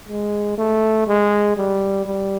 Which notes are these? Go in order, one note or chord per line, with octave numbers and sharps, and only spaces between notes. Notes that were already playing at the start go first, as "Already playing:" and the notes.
G#3
A3
G#3
G3
G3